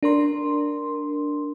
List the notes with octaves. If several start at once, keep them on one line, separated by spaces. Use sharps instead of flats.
D4 A#4 C6